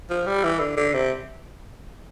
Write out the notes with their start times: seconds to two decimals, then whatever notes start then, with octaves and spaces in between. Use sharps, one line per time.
0.10 F3
0.27 G3
0.44 E3
0.60 D3
0.77 D3
0.94 C3